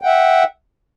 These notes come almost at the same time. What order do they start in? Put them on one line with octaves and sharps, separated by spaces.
G5 F#5 E5